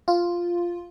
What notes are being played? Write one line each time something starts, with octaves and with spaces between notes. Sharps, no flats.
F4